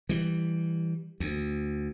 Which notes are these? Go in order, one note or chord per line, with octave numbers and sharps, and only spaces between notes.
E3 G3
D2